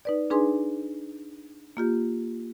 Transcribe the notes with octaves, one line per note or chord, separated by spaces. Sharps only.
D#4 B4 D5
D4 D#4 G#4 B4 G#5 C6
A#3 F4 G4